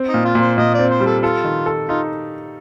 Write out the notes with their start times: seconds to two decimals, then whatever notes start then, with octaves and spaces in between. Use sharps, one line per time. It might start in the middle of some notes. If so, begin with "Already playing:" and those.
Already playing: C4
0.09 D#4
0.14 A#2
0.25 F4
0.35 A#2
0.41 C5
0.58 A#2 D#5
0.74 C4 D5
0.90 C5
1.00 G3
1.06 A4
1.23 F4 A4
1.44 D#3
1.66 A4
1.88 D#4 F4